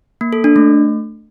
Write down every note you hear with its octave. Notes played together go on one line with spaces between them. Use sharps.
A#3
A4
D4
A3